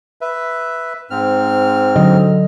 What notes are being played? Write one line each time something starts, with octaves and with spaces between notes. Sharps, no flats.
B4 E5
G#2 C4 F6
D3 F#3 D#5